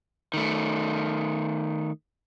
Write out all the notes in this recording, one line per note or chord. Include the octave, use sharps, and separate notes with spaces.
D#3 A3